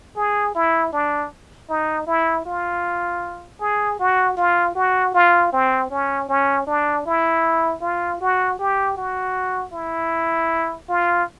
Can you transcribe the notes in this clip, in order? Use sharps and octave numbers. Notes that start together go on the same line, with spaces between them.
G#4
E4
D4
D#4
E4
F4
G#4
F#4
F4
F#4
F4
C4
C#4
C#4
D4
E4
F4
F#4
G4
F#4
E4
F4